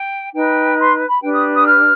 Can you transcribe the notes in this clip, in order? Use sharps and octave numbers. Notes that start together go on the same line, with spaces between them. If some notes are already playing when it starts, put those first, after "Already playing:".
Already playing: G5
D#4 B4 G5
C6
B5
D4 G4 B4 G5
D#6
D#6
F6